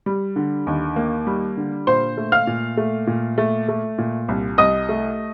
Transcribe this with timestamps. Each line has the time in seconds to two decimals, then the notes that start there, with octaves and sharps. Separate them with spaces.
0.06 G3
0.36 D3
0.67 D#2
0.96 A#3
1.27 G3
1.57 D3
1.87 A#2 C5 C6
2.17 A3
2.32 F5 F6
2.47 A#2
2.77 A3
3.07 A#2
3.38 A3
3.68 A3
3.98 A#2
4.28 C2
4.58 C2 D#5 D#6
4.89 A3